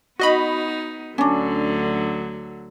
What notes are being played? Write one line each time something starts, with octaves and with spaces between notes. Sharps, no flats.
B3 D#4 F#4 D#5 B5
D2 D3 F#3 C#4 D4